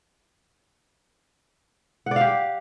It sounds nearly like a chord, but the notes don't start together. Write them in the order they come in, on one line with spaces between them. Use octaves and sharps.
F#5 D5 F5 G4